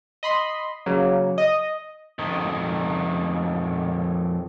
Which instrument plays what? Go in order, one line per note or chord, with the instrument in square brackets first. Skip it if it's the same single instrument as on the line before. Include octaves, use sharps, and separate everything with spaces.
[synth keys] D#5 B5 C6
C#3 F#3 A#3
D#5
[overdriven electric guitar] F2 D#3